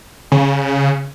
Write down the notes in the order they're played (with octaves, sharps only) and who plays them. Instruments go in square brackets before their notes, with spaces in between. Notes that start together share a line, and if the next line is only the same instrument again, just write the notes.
[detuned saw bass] C#3